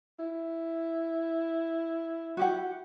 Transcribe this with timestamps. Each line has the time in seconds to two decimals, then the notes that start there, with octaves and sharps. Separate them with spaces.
0.19 E4
2.37 F#4 G4 F#5